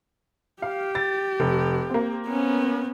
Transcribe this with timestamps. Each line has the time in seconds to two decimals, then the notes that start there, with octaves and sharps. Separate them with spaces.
0.62 G4 F5
0.95 A6
1.40 F1
1.90 A#3 C4
2.26 B3 C#4